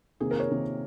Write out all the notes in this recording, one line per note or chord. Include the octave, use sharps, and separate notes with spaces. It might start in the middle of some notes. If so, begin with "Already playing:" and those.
C3 D#3 A#3 G#4
A#4
C#5
C3 D#3 A#3